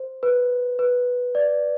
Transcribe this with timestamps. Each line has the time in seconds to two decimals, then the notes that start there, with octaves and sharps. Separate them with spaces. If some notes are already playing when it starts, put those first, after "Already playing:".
Already playing: C5
0.23 B4
0.79 B4
1.35 D5